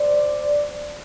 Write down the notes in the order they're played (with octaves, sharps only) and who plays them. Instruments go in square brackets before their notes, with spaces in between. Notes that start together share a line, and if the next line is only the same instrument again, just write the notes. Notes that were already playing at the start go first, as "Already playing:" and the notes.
Already playing: [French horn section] C5 D5